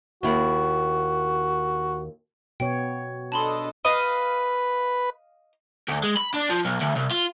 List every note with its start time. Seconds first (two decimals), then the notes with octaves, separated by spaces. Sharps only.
0.23 D#2 E4 F#4
2.60 B2 B3 C#5 G5
3.32 D4 A4 D#5 A5 B5 C6
3.85 B4 D#5 F5
5.89 D2
6.03 G#3
6.17 B5
6.34 D4
6.49 F3
6.65 B1
6.81 D2
6.96 C2
7.11 F4